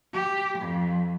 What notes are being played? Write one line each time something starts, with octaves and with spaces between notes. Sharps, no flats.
G4
F2